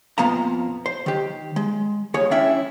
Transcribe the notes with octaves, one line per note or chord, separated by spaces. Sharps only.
F2 A#2 F3 B3 F5 A#5
C5
D#3 G4
G#3
D#2 G#4 C#5
C#4 D4 E4 G#4 E5 G5